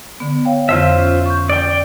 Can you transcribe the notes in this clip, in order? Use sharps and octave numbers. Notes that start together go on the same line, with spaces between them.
D3 B3
C#5 F5 G5
F2 D3 F4 C5 E5
C#4
C#6 G6
D5 G5